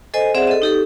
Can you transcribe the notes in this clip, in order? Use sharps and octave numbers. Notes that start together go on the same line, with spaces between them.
A4 C5 D#5 G#5
C4 G#4 C5 D5 E5 F#5
A4 D#5
D#4 G4 A4